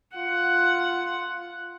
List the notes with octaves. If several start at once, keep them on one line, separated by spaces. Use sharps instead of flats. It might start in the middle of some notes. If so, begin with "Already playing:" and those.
F4 F#5